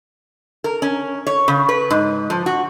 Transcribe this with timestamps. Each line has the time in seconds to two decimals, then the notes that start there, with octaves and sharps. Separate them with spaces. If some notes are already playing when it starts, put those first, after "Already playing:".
0.64 A#4
0.82 C#4
1.27 C#5
1.48 C#3
1.69 B4
1.90 G#2
2.30 F3
2.46 F#4